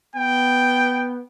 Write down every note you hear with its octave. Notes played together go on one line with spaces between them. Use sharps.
B3 G5